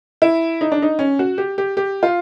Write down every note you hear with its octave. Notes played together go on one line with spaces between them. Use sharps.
E4
D#4
D4
D#4
C#4
F#4
G4
G4
G4
F4